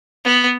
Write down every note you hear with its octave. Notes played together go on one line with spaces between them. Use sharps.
B3